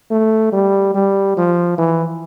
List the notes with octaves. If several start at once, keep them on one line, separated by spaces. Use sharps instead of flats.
A3
G3
G3
F3
E3